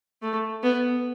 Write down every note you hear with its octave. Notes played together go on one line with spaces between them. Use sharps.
A3
B3